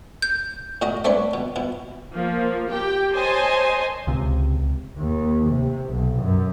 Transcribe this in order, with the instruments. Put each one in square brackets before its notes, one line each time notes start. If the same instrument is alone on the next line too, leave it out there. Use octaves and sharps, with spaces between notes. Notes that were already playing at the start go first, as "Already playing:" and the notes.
[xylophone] G6
[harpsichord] A2 F#4 D#5 A#5
A3 C4 D4 B4 C#5
B2
B2 E4
[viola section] F3 A#3
G4 G5
C5 C#5 D#5 G#5 A5 C6
[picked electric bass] C#2 C3
[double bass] D#2
C3
B1
F#2